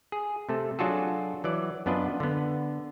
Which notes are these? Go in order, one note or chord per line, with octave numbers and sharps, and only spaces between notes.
G#4
C3 A3 A4
F#3 D4 F4 F#4 G#4 A4
E3 F#3 D5
F#2 B3 D4 F4 B4 D#5
D3 B3